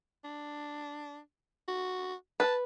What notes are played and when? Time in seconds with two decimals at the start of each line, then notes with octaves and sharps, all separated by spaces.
0.24 D4
1.68 F#4
2.40 B4 A5